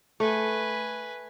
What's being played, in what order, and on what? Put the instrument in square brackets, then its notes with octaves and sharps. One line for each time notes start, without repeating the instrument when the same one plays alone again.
[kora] A3 [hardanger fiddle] B4 G#5